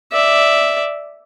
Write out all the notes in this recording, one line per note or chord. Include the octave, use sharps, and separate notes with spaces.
D5 E5